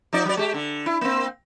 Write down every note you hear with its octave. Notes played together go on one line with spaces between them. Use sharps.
F3 D#4 D5
F#3 D5
G#3 G4
D3
E4
A#3 C4